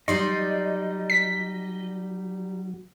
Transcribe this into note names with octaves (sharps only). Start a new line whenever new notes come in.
F#3 G3 D#4 D5 D#5 C6
B6